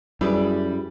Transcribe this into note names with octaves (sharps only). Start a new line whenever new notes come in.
F#2 G3 E4 G4 G#4 B4 D5